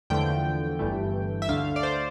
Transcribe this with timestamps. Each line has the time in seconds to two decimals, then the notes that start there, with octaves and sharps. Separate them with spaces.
0.10 E2 D3 F3 A3 G5
0.79 G1 G2 E3 A3
1.42 E5
1.49 D2 D3 A3 F5
1.76 D5
1.83 C5